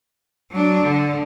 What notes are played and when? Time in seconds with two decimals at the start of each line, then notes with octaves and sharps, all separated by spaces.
0.51 F#3 D4
0.82 D3